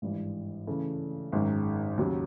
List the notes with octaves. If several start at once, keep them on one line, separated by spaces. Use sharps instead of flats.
G#1 G2 E3
C#3 E3 A3
G#1 F#2 D#3 G#3
D#2 C#3 F#3